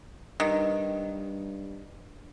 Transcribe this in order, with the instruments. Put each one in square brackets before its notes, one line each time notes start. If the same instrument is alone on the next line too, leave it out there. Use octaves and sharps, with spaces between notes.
[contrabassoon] G2 [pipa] D#3